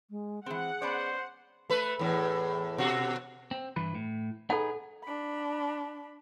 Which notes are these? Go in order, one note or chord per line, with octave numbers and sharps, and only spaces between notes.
G#3
E3 C4 G#4 F#5
B3 C#4 C5 D5
A3 B4
E2 A2
B2 F#4
C4
G2 E3 B4
A2
D#4 G#4 A4 B4 F#5
D4 B5